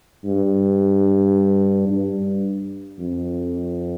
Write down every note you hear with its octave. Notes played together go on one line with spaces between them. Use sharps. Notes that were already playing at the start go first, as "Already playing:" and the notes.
G2
G2
F2